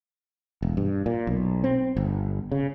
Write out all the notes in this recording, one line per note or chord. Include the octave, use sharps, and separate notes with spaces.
E1
G2
A#2
B1
C4
G1
C#3